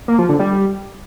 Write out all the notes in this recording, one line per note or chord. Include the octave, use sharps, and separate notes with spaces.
A#3
F3
D3
G3